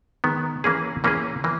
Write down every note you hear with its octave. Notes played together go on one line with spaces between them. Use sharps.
D#3 G#3 B3
E3 A#3 C#4 G#4
E3 A#3 C#4 G#4
E3 A#3